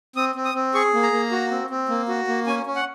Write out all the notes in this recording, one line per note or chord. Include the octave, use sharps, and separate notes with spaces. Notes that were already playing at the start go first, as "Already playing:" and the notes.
C4 D#6
C4
D#6
C4
G#4 C#6
A#3
A#5
A#3
F#4
C4
C4
A#3
F#4
A#3
C#4 G#5
C#4
F#5